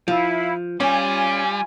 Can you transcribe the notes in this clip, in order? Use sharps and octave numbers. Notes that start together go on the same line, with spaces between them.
F3 E4 F5
G3 C#4 F4 G#5